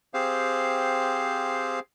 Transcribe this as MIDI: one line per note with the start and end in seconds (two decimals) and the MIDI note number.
0.14 1.80 60
0.14 1.80 67
0.14 1.80 68
0.14 1.80 72
0.14 1.80 77